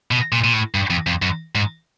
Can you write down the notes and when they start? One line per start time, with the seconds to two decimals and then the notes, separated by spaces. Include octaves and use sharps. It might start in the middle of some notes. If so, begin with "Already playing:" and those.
0.11 B2
0.32 A#2
0.44 A#2
0.53 A2
0.75 G2
0.90 F2
1.07 F2
1.22 F#2
1.55 G#2